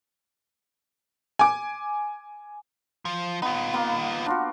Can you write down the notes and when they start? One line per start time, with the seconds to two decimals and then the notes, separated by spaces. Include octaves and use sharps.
1.39 G#5 D6
3.05 F3
3.42 B3 D#4 F4
3.73 A#3 B3
4.26 D4 F4 F#4